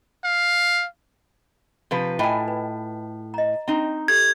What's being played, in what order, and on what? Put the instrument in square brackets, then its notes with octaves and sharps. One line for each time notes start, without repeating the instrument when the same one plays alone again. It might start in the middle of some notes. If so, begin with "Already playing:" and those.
[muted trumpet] F5
[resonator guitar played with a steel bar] C3 F3 B4
[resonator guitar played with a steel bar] A2 G#5 [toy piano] F4 D#5 G5
[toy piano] B4
D#5 A#5
[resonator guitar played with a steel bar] C4 D#4 [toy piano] A#5
[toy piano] G4 A4 [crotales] G#6